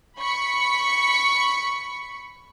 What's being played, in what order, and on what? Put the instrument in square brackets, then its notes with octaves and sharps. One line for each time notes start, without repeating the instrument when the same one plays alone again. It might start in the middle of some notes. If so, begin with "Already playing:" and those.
[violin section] B5 C#6 B6 C#7